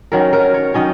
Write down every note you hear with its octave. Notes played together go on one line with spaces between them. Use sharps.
D#3 F#3 C#4 A#4
A#4
C#5
D#3 F#3 C#4 D#5